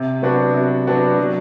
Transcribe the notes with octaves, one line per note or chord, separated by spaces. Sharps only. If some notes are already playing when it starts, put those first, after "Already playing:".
Already playing: C3
F#3 B3 D4 F#4
C3
F#3 B3 D4 F#4
F#3